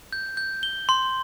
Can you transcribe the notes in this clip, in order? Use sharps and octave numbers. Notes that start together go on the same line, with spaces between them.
G6
G6
G7
C6